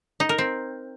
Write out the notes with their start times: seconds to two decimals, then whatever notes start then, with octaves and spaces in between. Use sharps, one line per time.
0.20 D#4
0.29 A#4
0.38 C4